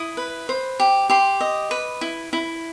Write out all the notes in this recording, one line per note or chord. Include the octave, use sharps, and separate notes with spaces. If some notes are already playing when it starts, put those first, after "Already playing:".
Already playing: E4 D#6
B4
C5
G4
G4 C6
D#5
B4
E4
E4